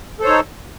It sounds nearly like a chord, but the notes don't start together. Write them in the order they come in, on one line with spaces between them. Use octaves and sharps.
A4 C5 C#5 D#4